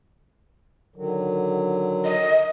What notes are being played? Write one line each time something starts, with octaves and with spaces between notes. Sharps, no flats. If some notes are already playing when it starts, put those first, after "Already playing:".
D3 D#3 F#3
D#5